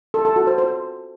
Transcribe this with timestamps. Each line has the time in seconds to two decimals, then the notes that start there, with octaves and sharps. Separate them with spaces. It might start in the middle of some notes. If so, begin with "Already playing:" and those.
0.14 A4
0.25 A4
0.36 F#4
0.47 C5
0.58 C5